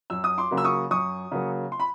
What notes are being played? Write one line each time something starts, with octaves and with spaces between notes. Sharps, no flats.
F#2 E6
D#6
C6 D6
C#3 F#3 A#3
E6
C#6 D#6
F#2 C#6 D#6
C#3 F#3 A#3
C6
B5